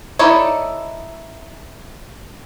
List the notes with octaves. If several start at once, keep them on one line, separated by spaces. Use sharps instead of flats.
D#4 E4 A4 C#5 D5